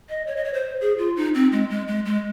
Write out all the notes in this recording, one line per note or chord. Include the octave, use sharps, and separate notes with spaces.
D#5
C#5
D#5
C#5
C5
G#4
F4
D#4
C4
G#3
G#3
G#3
G#3